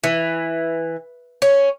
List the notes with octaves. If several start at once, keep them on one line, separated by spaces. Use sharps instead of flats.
E3
C#4